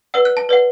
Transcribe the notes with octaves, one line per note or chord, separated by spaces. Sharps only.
B4 D5 F#5 E6
F#6
A5
B4 D5 F#5